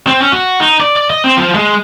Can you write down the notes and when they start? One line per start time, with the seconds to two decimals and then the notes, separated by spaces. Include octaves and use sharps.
0.07 C4
0.21 C#4
0.32 F#4
0.60 D#4
0.81 D5
0.96 D5
1.10 D#5
1.24 C4
1.37 F3
1.55 G#3